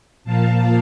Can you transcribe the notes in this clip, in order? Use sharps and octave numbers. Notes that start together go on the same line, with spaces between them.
A#2 F3 A#3 F5 A5